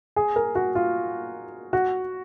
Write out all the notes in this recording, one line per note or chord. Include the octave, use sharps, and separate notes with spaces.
G#4
A#4
F#4
F4
F#4